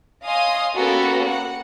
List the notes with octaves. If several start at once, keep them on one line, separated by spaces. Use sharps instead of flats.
C#5 D#5 F5 G#5 C6 D#6
A#3 B3 C#4 F#4 G4 A4
F#5